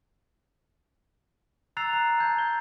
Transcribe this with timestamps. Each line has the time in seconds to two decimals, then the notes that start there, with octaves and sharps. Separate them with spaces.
1.77 A#5 E6 F#6 A6 C7 F7
1.93 A#5
2.18 A5 G6 G#6
2.38 G7